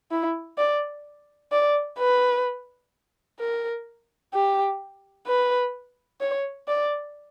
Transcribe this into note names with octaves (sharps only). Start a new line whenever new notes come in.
E4
D5
D5
B4
A#4
G4
B4
C#5
D5